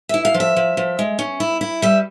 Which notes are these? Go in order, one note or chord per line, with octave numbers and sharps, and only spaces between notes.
E4 E5
F5
F3
E5
F3
F3
G#3
C#4
E4
E4
G3 E5